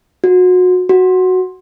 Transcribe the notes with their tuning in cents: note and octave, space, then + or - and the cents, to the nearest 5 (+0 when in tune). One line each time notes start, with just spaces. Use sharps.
F#4 -25
F#4 +0